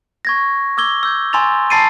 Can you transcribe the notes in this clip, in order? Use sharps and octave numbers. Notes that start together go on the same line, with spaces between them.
C#6 G#6 A#6
D6 E6 G#6 G7
E6 G6 G#6
G#5 A#5 C6 E6 A6 F7
A5 B5 A6 C7 D7 D#7